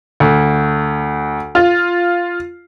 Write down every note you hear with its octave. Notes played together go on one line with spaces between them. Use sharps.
D2
F4